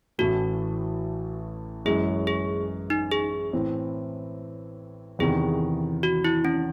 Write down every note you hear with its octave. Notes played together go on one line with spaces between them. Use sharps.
A1 A2 E3 A3 F#4
F#2 E3 G#3 C#4 G#4
G#4
D#4
G#4
A2 E3 C4
E2 C3 D#3 G#4
F#4
E4
C#4